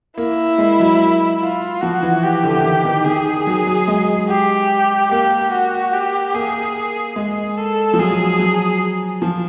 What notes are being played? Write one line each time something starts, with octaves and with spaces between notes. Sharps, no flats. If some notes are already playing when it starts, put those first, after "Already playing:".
A#3 E4
G#3
F#3
F4
F3 F#4
E3
G4
D3
E3
D#3
D#3
D#3 G#4
F#3
F#3
G#3
G4
A#3 G4
F#4
G4
A#3 G#4
G#3 G#4
A4
F3
F#3 G#4
F#3
F3